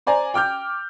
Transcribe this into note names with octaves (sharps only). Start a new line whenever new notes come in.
C5 D5 G#5 A#5
G5 D6 F6 G6